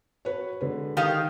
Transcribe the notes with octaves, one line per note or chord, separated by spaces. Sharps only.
F#4 B4 C#5
D3 G#3 B4
D#3 G4 F5